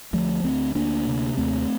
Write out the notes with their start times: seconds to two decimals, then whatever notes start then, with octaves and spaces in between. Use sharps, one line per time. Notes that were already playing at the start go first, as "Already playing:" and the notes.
0.13 D2 F3 A3
0.44 D2 A3 C4
0.75 D2 A#3 D4
1.06 C3
1.37 D#2 A3 C4